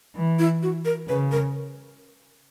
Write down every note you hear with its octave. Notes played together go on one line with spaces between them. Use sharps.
E3
E4
F#4
A#4
C#3 B4
A#4